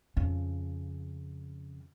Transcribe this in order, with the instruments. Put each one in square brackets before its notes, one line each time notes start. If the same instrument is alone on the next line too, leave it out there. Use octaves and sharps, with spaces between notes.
[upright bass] F2 C#3